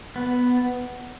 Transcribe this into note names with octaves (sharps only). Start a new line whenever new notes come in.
B3